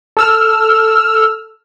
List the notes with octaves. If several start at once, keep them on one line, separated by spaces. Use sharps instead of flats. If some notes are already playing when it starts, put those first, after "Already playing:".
A4 E6 F6